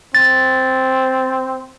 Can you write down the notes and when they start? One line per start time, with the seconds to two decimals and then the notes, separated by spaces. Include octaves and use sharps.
0.15 C4 A6